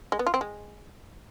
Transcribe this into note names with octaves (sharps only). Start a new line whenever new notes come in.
G#3
B3
F4
C4
G#3